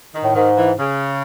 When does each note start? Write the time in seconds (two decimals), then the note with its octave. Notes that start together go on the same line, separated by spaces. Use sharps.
0.15 D#3
0.24 A2
0.35 G#2 D#3
0.56 E3
0.78 C#3